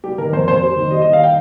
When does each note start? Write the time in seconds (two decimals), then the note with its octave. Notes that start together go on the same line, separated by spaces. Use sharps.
0.04 G3 G4
0.18 D#3 A#4
0.32 F2 C5
0.48 F2 C5
0.62 G3
0.77 D#3
0.91 G3 D#5
1.02 D#3 D#5
1.13 F5
1.24 G5